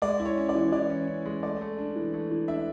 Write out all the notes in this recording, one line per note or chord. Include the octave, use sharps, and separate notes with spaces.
G#3 D5
E4
C#5
C#4
D5
E3
E3 D5
C#4
C#4
G#3
A3 D5
A3
D4
E3
A3
E3
D4 E5